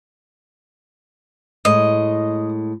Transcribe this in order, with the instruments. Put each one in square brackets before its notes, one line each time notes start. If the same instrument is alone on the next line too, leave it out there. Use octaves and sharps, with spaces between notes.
[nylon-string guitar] A2 G#3 [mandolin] D#5